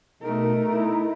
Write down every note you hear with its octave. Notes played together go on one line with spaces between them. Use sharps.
B2 A3 D#4 A#4
D#4 E4